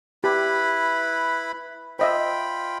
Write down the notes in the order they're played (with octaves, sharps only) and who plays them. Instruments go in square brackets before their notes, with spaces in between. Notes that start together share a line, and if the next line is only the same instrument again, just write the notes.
[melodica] E4 B4 B5 [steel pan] G4
[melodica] F4 G5 B5 [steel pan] C5 D#5 E5